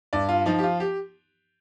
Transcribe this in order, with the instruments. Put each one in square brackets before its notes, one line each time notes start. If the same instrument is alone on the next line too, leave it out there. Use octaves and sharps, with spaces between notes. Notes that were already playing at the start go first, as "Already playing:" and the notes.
[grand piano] G2 D5
F4
F3 D#4
G4
F4
G4